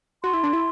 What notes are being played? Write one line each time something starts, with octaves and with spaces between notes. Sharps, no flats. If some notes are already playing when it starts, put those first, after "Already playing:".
F#4 C6
E4
D4
E4